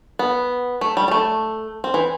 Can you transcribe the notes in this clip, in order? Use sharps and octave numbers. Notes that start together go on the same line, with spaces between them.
B3
A3
G3
G3
A3
C4
E3